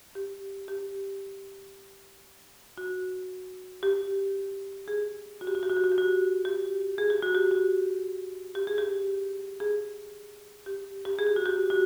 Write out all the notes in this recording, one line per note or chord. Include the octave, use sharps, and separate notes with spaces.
G4
G4
F#4
G4
G#4
F#4
G4
F#4
G4
F#4
G4
F#4
G4
F#4
G4
G#4
G4
F#4
G4
F#4
G4
G#4
G4
G#4
G4
G4
G#4
G4
F#4
G4
F#4